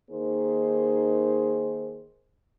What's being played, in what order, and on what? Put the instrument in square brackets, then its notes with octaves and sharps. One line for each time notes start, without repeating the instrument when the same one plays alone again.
[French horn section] D#3 A#3 D#4 G#4 C5